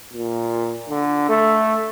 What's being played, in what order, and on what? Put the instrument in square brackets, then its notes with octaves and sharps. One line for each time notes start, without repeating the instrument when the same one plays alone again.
[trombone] A#2
D3
A3